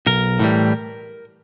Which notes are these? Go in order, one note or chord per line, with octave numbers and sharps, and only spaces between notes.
B1 A#4
A2 E3 G3